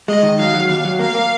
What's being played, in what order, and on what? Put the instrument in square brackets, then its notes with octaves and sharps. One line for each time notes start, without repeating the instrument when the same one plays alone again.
[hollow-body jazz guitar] G#3 [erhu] D#5
[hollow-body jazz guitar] D#3
[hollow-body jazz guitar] F#3 [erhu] F5
[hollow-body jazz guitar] F#3
[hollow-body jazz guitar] D#2 [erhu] F5
[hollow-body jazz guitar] F#3
[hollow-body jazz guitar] A#3 [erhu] F5
[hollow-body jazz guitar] A#3